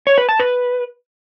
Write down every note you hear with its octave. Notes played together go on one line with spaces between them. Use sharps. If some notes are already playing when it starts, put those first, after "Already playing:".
C#5
B4
A5
B4